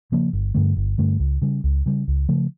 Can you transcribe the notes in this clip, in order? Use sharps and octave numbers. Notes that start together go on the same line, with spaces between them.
C#3 F3 A#3
G1
G2 D3 A3
G1
G2 D3 A3
C#2
C#3 G3
C#2
C#3 G3
C#2
C#3 F3 A3